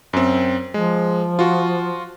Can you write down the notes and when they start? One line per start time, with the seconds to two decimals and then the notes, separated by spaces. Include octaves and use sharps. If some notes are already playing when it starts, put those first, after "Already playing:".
0.13 F#2 C4
0.74 F3 G#3
1.39 F4 F#4